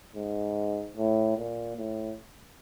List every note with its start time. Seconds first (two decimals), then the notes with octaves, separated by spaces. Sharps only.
0.16 G#2
0.97 A2
1.37 A#2
1.77 A2